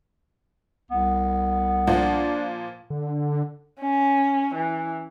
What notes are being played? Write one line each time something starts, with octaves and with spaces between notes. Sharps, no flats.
C2 B3
A#2 F3 D4
D3
C#4
E3